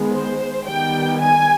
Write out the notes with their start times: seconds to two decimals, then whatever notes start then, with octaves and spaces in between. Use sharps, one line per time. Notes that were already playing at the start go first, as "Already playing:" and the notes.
Already playing: D#3 G#3 B3
0.14 C5
0.67 D#3 G3 B3 G5
1.21 G#5